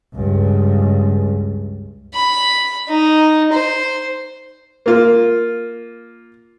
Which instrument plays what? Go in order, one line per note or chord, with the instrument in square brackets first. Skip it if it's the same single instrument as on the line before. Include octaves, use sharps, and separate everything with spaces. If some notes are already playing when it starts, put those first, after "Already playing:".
[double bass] C#2 G2
[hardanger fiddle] B5
D#4
C5
[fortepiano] A#3 F4